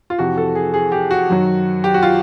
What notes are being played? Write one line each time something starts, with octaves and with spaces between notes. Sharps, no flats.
F4
F2 C3 E3 F#4
A4
G#4
G#4
G4
F#4
F#2 D#3 F#3
G4
F#4
F4